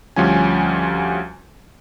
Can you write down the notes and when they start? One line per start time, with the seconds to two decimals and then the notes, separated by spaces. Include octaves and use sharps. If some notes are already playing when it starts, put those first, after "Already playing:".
0.16 D2 F3 G3 C#4 G#5